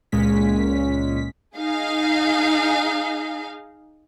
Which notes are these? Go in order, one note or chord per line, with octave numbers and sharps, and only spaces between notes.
C#2 A#2 G#3 C#4 B6
D#4 G#4 F5